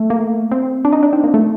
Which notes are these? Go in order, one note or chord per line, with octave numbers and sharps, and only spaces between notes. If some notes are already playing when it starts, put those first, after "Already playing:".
Already playing: A3
A#3
C4
D4
D#4
D4
C4
A#3
A3